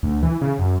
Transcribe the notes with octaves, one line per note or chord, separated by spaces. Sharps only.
D2
E3
C#3
F#2